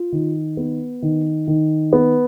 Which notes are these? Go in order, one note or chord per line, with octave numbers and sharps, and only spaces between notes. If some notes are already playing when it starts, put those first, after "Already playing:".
Already playing: F4
D#3
B3
D#3
D#3
B3